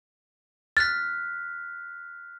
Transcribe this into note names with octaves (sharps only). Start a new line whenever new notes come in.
F6 F#6 A6 B6